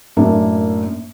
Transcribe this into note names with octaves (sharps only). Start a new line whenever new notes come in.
F#2 A2 A#3 D4